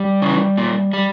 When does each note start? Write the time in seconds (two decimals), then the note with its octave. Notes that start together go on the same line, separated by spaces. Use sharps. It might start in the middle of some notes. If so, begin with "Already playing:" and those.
Already playing: G3
0.22 C#3 E3
0.57 A#2
0.93 G3